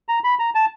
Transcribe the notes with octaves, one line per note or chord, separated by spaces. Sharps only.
A#5
B5
A#5
A5